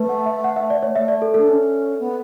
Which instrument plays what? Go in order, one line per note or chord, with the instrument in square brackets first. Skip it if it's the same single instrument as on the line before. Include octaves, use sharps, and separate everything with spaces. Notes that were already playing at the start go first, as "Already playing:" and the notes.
Already playing: [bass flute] A3 [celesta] B4
[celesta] F#5
E5
F#5
E5
D5
C#5
[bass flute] A3 [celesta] E5
[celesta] D5
A4
[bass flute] D4 [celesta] A4
[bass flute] C#4
B3